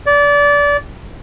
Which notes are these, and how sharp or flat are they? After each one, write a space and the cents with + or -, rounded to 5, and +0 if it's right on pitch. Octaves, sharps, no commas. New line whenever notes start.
D5 -25